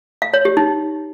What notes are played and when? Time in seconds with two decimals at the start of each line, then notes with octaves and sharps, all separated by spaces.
0.22 F5
0.34 C#5
0.45 G4
0.57 D#4